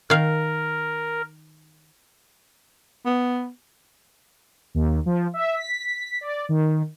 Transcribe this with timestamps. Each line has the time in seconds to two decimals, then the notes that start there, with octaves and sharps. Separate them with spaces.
0.10 D#3 A#4 F5
3.06 B3
4.74 D#2
5.06 F3
5.34 E5
5.56 B6
6.21 D5
6.49 D#3